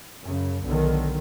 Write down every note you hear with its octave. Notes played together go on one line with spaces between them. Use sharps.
F#2 C#3
B1 D3 D#3